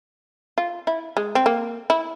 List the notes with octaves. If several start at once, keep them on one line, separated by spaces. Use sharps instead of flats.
F4
E4
G#3
C4
A#3
E4